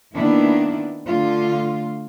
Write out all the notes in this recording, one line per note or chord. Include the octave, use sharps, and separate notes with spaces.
D#3 A#3 B3 D4 E4
D3 A3 F4